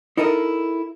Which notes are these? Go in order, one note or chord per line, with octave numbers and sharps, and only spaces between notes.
D#4 E4 A4 A#4 C#5 D#5